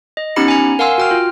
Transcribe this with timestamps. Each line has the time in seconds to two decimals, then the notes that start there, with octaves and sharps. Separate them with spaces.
0.17 D#5
0.36 B3 C#4 D#4 G4 B5 C#7
0.48 G#5 A#5
0.79 A#4 F5 F#5 G#5 C6 E6
0.98 F#4 G5 F6
1.11 F4